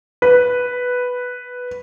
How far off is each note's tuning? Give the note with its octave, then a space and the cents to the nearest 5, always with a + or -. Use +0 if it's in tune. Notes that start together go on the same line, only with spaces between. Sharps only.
B4 +0